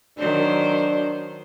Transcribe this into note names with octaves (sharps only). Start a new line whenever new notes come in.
D#3 F#3 D4 C5